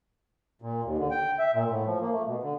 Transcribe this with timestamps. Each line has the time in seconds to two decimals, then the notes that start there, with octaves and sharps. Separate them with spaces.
0.62 A#2
0.84 D#2
0.98 D3
1.11 G5
1.39 E5
1.54 A#2
1.70 A2
1.86 F3
2.01 A#3
2.13 A3
2.26 B2
2.43 D3